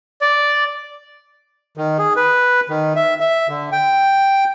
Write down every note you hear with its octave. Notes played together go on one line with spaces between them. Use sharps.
D5
D#3
G#4
B4
D#3
E5
E5
D3
G5